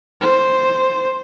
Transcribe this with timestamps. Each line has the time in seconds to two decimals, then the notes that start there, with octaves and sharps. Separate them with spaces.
0.21 C5